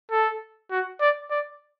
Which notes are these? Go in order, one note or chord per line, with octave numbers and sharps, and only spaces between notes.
A4
F#4
D5
D5